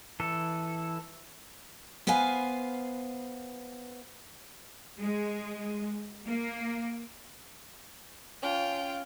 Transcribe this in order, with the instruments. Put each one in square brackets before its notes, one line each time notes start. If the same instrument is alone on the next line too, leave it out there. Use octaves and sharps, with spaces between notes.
[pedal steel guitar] E3 A4
[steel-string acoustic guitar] B3 B4 C5 F5 G#5
[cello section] G#3
A#3
[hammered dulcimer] C#4 [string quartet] F4 G5